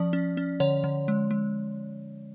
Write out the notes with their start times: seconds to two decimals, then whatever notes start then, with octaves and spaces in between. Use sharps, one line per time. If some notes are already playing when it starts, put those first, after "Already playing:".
Already playing: F3 C#4 D5
0.13 C#4
0.37 C#4
0.60 D3 C#5
0.84 D3
1.08 G#3
1.31 G#3